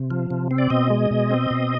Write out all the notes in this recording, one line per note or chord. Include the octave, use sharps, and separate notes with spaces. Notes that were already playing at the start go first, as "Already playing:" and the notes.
Already playing: C3
F3
C3
C4
D5
B2 D#5
G#3
B2
C4
B2